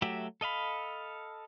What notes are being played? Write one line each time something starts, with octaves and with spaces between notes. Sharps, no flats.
F#3 A3 F#4 G4 E5
A4 D#5 F5 B5